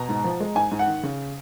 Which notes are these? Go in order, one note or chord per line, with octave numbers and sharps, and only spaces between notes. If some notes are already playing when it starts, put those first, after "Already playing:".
Already playing: B2 A#5
G#2
F3
G#3
G#2 G#5
G#2
F#5
D#3
C#3